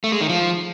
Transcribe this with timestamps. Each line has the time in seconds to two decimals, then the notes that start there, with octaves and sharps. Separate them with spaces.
0.04 A3
0.12 G#3
0.21 D#3
0.29 F3